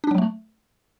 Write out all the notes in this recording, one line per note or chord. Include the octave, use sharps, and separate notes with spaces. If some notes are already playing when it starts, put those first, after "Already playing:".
D4
F#3
A3